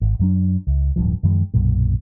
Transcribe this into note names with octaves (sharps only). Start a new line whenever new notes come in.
G#1
F#2 F#3 D4
C#2
D1 E2 G2 F3
F#2 D#3 F3 G#3
B1 F#2 A#2